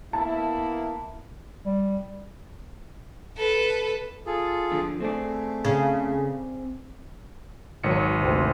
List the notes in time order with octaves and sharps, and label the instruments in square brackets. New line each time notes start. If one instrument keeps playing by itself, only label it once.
[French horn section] A#3 B3 E4 [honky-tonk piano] A5
[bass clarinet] G3
[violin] A4 B4
[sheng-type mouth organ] F4 G#4 A4
[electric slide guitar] D3 F3
[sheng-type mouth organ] A3 [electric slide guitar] C4 G#4 D5
[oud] C#3
[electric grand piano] G#1 C#7 [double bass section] F#3
[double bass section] D2 C3